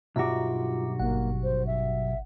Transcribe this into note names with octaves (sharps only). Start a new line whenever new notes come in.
B1 G2 F4 F#4 E5 A#5 D6
G#1 A#3 F#5
C5
E5